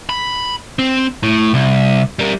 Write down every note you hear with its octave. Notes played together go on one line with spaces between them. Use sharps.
B5
C4
A2
C2
G3 A#4